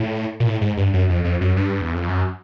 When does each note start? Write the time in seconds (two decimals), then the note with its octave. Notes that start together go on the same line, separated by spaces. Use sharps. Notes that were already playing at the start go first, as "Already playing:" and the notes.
Already playing: A2
0.40 A#2
0.46 A2
0.61 G#2
0.77 G2
0.93 F#2
1.10 F2
1.24 F2
1.41 F#2
1.56 G2
1.81 E2
1.95 F2
2.09 F#2